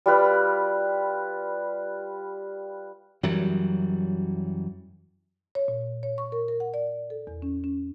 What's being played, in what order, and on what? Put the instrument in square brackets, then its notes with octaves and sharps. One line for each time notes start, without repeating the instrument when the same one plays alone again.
[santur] G3 F4 B4
[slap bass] F#2 E3 F#3 G3
[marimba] C#5
A#2
C#5
C#6
A#4
A#4
F#5
D5
A4
E2
C#4
C#4